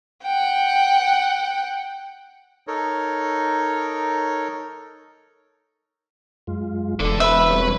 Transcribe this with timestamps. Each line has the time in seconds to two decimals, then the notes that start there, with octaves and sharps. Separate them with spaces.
0.23 F#5 G5
2.67 D#4 A4 A#4 C#5
6.47 F#2 G#3 F4
7.00 E1 D3 A4
7.20 B4 C5 E5 B5
7.50 G3 C4 C#5